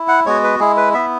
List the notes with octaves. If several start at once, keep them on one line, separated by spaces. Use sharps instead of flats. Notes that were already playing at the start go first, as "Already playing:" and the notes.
Already playing: E4
F#5
G#3 B3 F#4 C#5
B4
G#3 E4 G#4
B4
B3 E4 E5